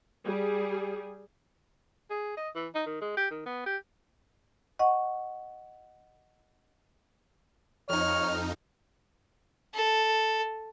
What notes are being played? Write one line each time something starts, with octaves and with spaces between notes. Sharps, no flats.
G3 G#4
G#4
D#5
E3
D#4
D#3
G#3
G4
D#3
B3
G4
D#5 F#5 C#6
F2 D#4 C#5 F6
A4